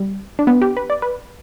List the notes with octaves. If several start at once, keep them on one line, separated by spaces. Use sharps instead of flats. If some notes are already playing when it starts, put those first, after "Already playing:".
Already playing: G3
D4
B3
G4
B4
D5
B4